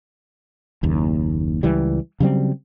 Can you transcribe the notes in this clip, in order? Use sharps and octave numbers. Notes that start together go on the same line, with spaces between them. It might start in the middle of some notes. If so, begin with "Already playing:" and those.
F#1 D#2
C#2 E3 G3
C#3 F#3 G3 C4